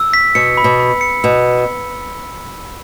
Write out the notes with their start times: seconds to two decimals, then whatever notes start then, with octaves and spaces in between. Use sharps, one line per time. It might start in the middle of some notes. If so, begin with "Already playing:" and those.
Already playing: E6
0.13 B6
0.35 B2 C#7
0.57 B5
0.64 B2
0.80 B5
1.01 C#7
1.23 B2 E6